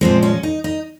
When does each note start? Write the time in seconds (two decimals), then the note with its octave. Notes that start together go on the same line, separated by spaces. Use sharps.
0.01 A#2 F3 G#3 C4
0.23 C#4
0.43 D#4
0.64 D#4